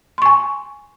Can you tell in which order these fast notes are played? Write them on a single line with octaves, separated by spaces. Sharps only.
C6 C#6 G#5